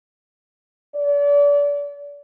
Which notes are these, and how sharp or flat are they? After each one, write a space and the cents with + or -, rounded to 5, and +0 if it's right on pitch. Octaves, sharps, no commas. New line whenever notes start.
D5 -35